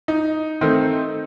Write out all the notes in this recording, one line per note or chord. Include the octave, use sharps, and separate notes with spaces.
D#4
D#3 A3 C4